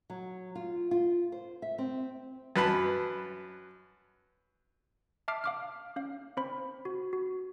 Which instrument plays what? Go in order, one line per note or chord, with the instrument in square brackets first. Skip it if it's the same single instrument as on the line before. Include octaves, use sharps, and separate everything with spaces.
[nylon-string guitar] F#3
F4
F4
C5
E5
C4
[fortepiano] F#2 B4 A5 B5
[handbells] E5 A5 D6 F6 C7
F5 D6 F6
C#4 F5
C4 C5 B5
F#4
F#4